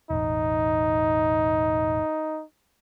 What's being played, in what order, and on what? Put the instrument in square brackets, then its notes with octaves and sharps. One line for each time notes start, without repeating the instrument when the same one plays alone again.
[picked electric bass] E1 A1 [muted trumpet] D#4